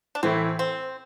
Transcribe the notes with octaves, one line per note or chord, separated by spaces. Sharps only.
D4
A2 E3 A3 C4 E4
C4